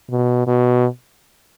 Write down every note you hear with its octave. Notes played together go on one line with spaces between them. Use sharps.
B2
B2